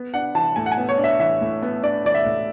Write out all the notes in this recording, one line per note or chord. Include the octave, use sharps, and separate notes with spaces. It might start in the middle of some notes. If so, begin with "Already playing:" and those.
Already playing: B3
D4 F#5
E3 A5
A2 G#5
F#5
G#5
B3
C#5
D4
E5
E3 E5
A2
B3
D4 D5
E3 D5
E5
A2